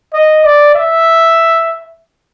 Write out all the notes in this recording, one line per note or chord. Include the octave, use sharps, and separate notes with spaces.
D#5
D5
E5